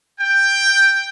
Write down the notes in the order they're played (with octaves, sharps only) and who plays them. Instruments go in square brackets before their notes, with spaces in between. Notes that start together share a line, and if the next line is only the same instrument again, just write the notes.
[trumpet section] G5